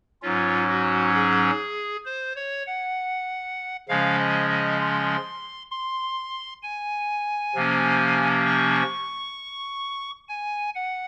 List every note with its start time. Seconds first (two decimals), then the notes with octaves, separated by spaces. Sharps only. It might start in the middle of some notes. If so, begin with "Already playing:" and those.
0.22 G#2 F#3 C#4 F4
0.69 F#4
1.14 G#4
2.06 C5
2.36 C#5
2.67 F#5
3.88 C#3 F3 G#3 C#4 F5
4.19 D#5
4.50 D#5
4.81 C6
5.71 C6
6.63 G#5
7.55 C3 F3 A#3 C#4
8.46 C#6
10.29 G#5
10.75 F#5